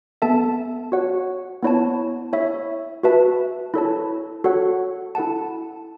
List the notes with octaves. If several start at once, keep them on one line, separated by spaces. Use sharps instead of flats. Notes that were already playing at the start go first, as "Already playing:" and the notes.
B3 A4 E5 A5
F#4 C#5 F#5
B3 E4 C#5 A5
E4 C#5 E5
F#4 B4 E5 A5
E4 A4 C#5 A5
F#4 A4 C#5 F#5
E4 A4 F#5 A5